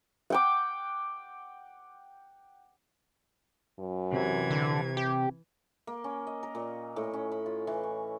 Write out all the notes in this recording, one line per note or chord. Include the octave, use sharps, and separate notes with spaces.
F#5 G5 D6
F#2
C3 E3 G#6
D3
G4
A#3
C#4
D#5
A#4
A#2
A2
C#4
B5
F4
E3
C#6